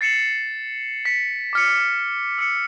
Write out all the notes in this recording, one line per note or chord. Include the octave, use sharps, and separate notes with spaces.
A6 C7 C#7 E7 F#7
B6 C#7
D6 F6 C#7
E6 C#7